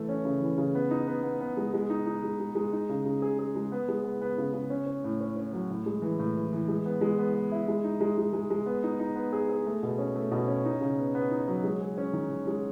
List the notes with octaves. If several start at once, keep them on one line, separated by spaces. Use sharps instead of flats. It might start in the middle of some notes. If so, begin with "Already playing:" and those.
Already playing: E3 A3
C#4
C#3
E3
C#3
B3
D#4
B3
B3
B3
G#3
G#3
D#4
D#4
G#3
G#3
G#3
D#4
C#3
C#3
G#4
G#4
G#3
B3
G#3
B3
B3
C#3
C#3
C#4
C#4
A2
C#4
C#4
F#3
A2
G#3
E3
A2
E3
E3
G#3
B3
G#3
B3
B3
E4
G#3
D#4
G#3
G#3
G#3
G#3
B3
D#4
D#4
B3
G#4
G#4
A3
B2
C#4
A3
B2
C#4
D#4
C#3
B3
B3
D#4
F#3
G#3
G#4
C#4
D#3
D#3
G#3